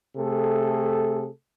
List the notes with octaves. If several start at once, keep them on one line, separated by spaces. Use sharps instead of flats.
C3 A3 G#4 A4